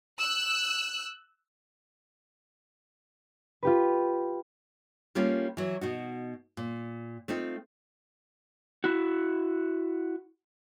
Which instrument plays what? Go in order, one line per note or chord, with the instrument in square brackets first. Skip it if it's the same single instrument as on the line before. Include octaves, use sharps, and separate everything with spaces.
[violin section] E6 F#6
[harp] F4 G4 B4
[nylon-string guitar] G3 A3 A#3 C#4 F4
E3 F#3
B2 D#4 F#4
A#2
A3 C4 D#4 F4
[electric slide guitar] E4 F#4